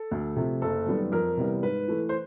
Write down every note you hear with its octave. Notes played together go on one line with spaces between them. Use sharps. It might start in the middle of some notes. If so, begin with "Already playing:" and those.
Already playing: A4
D2
C3 F3 A3
F#1 A4
F#2 D#3 G3 B3
F2 A#4
C3 E3 G3 B3
G#2 B4
E3 A3
C5